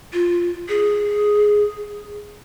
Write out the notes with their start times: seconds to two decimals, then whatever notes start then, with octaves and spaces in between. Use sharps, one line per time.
0.13 F4
0.69 G#4